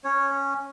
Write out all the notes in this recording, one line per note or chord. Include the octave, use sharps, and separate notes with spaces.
C#4 C#5